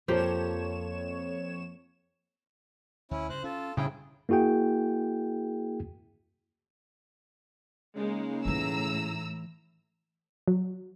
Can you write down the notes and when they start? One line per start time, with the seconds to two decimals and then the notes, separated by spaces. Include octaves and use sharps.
0.08 F2 F3 A#3 G4 A4 C5 C#5 E7
3.11 D2 C#4 E4
3.30 G2 C#3 C5 F#6
3.44 C#4 F4 A4
3.77 A2 C#3 G3 D4 E4 G#4 G5
4.29 A#3 E4 F#4 G#4 G5
7.96 C#3 G#3 A#3 D#4
8.45 A2 E3 D#4 E4 A#5 E6
10.48 F#3